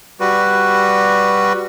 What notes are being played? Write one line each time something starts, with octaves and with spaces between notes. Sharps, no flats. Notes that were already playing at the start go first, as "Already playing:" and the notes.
G3 F#4 B4